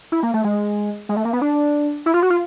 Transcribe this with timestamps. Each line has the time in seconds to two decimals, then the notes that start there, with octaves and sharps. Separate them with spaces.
0.12 E4
0.23 A#3
0.34 A3
0.44 G#3
1.09 G#3
1.17 A3
1.25 A#3
1.33 B3
1.42 D4
2.06 E4
2.14 F4
2.22 F#4
2.30 F4